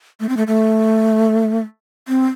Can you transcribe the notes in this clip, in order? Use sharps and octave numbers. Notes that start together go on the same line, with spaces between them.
A3
C4
A3
A3
C4